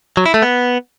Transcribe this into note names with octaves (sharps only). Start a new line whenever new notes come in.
F#3
E4
A3
B3